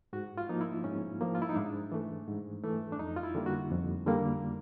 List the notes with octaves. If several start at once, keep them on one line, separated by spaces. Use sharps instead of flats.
G#2 F#4
F4
F3 A#3 D#4
E4
G#2 C#4
F3 A#3
F4
E4
D#4
G#2 D4
E3 A3
G#2
E3 A3
D4
F2 D#4
F4
E4
D3 G3 A#3
F#4
F2
D3 G3 A#3